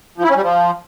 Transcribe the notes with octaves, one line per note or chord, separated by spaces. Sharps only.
F3
E4
C#4
G3
F3